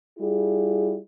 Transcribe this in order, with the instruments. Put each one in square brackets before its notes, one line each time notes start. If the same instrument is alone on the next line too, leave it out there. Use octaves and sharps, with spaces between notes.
[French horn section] G3 E4 F4 G#4